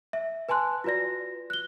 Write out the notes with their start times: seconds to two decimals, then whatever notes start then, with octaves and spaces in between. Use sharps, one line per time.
0.13 E5
0.49 B4 G#5 A5 C6 F#6
0.84 F4 F#4 B4 D5 A#6
1.50 F#6 G7